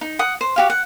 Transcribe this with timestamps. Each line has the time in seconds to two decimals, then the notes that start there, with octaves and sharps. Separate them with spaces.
0.01 D#4
0.19 F#5 D#6
0.41 C5
0.56 F#4 G4 F5
0.70 F#5